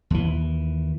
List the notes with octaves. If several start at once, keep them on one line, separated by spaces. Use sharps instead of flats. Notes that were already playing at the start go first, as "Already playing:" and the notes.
D#2 E3